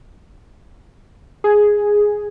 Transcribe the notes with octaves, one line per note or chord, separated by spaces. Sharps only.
G#4